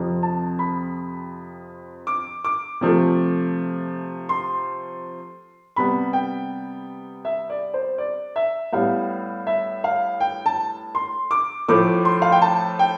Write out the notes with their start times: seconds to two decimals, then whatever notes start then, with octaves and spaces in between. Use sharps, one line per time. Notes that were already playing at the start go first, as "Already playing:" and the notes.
Already playing: F2 C3 F3
0.23 A5
0.59 B5
2.07 D6
2.45 D6
2.81 C3 F3 A3
4.29 C6
5.76 C3 G3 B3 B5
6.13 G5
7.25 E5
7.50 D5
7.74 C5
7.98 D5
8.36 E5
8.73 A2 G3 B3 F5
9.47 E5
9.84 F5
10.20 G5
10.46 A5
10.95 C6
11.31 D6
11.68 A2 F3 A3 D6
12.05 C6
12.22 F5
12.32 G5
12.42 A5
12.79 G5